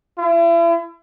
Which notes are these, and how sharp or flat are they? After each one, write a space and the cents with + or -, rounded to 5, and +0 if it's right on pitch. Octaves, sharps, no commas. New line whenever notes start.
E4 +40